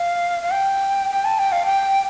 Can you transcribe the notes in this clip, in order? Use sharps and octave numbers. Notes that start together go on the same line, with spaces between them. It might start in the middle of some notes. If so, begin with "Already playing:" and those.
Already playing: F5
F5
G5
G5
A5
G5
F5
G5